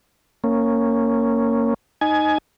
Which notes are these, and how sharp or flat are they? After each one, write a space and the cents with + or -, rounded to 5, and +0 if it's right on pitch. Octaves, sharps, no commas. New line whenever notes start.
A#3 -15 C#4 +0
D#4 -5 G#5 +20